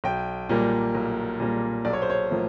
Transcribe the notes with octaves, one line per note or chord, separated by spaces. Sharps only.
B1 G5
A#2 G3 A#3
B1
A#2 G3 A#3
B1 D5
C#5
C5
C#5
A2 F3 A#3